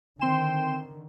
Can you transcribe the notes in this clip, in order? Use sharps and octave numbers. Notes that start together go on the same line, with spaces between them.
D3 D#3 C4 G5 C6 E7